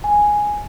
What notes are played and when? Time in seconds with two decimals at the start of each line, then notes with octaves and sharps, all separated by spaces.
0.04 G#5